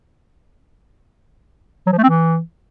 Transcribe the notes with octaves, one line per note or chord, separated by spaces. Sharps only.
F#3
F3
A3
C4
E3